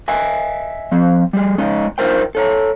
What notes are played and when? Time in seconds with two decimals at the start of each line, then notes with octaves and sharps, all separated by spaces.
0.08 D#5 E5 G#5
0.92 F3 C4
1.33 G3 G#4
1.58 G#3 C#4 D#4 D#5
1.98 D#4 F4 A#4 C5 G5
2.35 A4 C#5 A#5